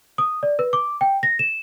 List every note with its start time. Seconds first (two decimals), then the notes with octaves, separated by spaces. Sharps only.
0.18 D#6
0.43 D5
0.59 B4
0.73 D6
1.01 G5
1.23 A#6
1.39 E7